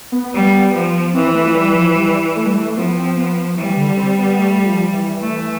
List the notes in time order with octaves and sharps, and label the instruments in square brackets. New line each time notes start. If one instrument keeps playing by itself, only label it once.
[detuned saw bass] B3
[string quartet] G3
F3
[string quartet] E3 [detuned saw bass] C4
[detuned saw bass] A3
F3
G3
F3
G3
A3
G3
A3
[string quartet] F3 [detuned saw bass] B3
[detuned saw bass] B3
C4
B3
[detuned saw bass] E3 [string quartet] G3
[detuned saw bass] D3
C4
B3
B3
A3
F3
E3
[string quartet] A3